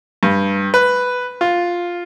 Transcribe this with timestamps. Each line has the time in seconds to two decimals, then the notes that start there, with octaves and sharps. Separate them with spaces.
0.23 G2
0.74 B4
1.41 F4